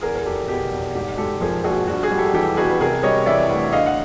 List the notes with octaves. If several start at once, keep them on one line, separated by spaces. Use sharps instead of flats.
E2 G#4 A#4
A#4
F1 G4 A4
B2 G4
F1
G#2 G4
G#3 G4 A4
F3 G#4 A#4
A#1 F#4 G#4
G2 F#4
F#4 G#4
G3
G4 A4
E3 G4 A4
G1 F#4 G#4
B4
C3 G#4 A#4
G3 C#5 D#5
E3 D5 E5
D2
D3 D#5 F5
F#5